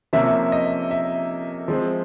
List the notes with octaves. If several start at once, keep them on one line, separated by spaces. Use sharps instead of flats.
C3 F3 A#3 C#4 E5
D#5
E5
F3 G#3 C4